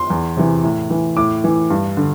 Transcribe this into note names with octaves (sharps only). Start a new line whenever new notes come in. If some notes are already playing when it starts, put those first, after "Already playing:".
Already playing: C6
E2
C3 E3
A2
E3
A2 D6
E3
G2
D3